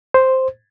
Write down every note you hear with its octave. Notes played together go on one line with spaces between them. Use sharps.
C5